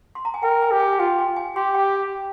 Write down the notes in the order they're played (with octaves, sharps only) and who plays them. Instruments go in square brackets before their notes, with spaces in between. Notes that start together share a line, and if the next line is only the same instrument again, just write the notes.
[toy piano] C6
A#5
G#5
[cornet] A#4 [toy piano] G5
[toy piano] G#5
[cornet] G4
[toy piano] G#5
G#5
[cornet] F4 [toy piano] G5
[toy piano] G#5
G#5
[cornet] G4 [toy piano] C6
[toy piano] G5